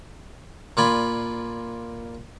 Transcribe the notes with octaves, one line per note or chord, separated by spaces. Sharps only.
A#2 F4 D5 G#5 B5